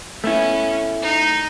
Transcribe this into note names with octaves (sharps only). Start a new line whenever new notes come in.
A3 B3 C#4 E4
D#4